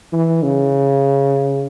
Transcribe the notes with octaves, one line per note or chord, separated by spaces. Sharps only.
E3
C#3